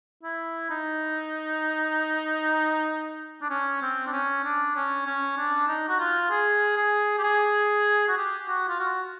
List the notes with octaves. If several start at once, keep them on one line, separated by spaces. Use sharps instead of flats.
E4
D#4
D4
C#4
C4
D4
C#4
D4
C#4
C#4
D4
D#4
F#4
F4
G#4
G#4
G4
G#4
F#4
G4
F#4
F4
F#4